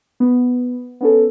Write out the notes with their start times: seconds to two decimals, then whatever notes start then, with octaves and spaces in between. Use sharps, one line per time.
0.20 B3
1.01 B3 C#4 A4